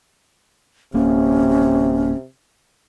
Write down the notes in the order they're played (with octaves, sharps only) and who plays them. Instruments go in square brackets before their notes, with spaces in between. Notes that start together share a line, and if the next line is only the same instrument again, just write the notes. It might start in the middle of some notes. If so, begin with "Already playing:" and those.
[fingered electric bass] D1 A#3 [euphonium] C3 [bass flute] C#4